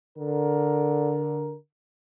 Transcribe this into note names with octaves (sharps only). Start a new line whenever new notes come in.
D3 A#4